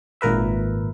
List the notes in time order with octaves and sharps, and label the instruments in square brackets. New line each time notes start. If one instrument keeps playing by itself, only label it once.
[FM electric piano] G#1 A#2 A#4 B4 E5